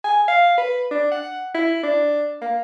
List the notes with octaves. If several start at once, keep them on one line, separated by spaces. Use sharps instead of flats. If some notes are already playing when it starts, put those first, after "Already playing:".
G#5
F5
B4
D4
F#5
E4
D4
A#3